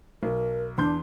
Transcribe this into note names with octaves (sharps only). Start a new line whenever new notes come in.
B1 A#4
E2 D4 C6 G6